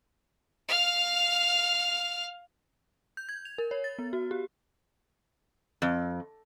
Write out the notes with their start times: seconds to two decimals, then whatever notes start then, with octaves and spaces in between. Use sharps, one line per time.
0.68 F5 F6
3.17 G6
3.29 G#6
3.45 F7
3.58 A#4
3.71 C#5
3.84 A6
3.99 B3
4.13 F#4
4.31 G4
5.82 F2